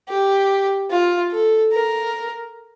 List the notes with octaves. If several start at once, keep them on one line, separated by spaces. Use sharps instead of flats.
G4
F4
A4
A#4